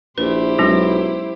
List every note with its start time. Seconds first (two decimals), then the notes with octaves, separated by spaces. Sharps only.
0.18 A#1 E4 G4 B4 C5
0.58 B1 F#3 G#3 C#4